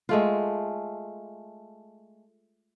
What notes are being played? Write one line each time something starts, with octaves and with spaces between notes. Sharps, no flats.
G#3 A3 F4